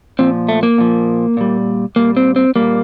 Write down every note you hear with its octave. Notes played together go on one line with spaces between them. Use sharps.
A#2 F3 C4
A3
A#3
A#2 F3
A#2 G3
A#2 G3 A#3
C4
C4
A#2 G3 A#3